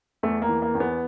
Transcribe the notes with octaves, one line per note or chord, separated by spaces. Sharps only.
E2 A3
A#3
E3
A#3
E2
B3